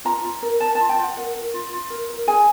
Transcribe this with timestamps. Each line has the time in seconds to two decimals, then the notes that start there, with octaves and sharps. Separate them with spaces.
0.05 F4 A#5
0.24 F4
0.43 A#4
0.60 A#4 A5
0.75 A5
0.80 F4
0.89 G5
0.98 F4 F#5
1.17 A#4 F#5
1.34 A#4
1.54 F4
1.72 F4
1.90 A#4
2.10 A#4
2.27 G#4 G#5